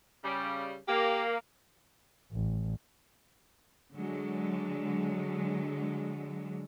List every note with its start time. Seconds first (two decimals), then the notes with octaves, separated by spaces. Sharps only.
0.23 C#3 G3
0.88 A#3 G4
2.33 A1
3.95 D3 F#3 G#3